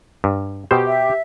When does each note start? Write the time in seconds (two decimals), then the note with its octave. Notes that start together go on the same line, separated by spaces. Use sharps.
0.24 G2
0.71 B2 G4 C5
0.87 E5